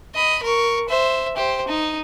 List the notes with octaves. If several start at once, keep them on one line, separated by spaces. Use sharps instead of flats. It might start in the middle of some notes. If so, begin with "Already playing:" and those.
D#5 B5
A#4 C#6
C5 E5
G4 C5
D#4